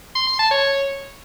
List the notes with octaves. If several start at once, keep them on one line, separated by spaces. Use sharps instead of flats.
C6
C6
A5
C#5